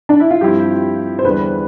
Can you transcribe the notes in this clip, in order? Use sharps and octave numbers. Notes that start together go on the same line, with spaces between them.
D4
E4
F4
G2 F3 C4 E4 G4
C5
E2 D3 G3 B4